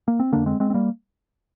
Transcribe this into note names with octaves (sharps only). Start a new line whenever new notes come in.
A#3
C4
F2 D3 A#3 D4
G#3 C4
G#3 C4
C4
G3 A#3